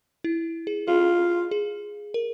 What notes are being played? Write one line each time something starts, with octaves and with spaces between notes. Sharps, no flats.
E4
G#4
F4 G#4
G#4
A#4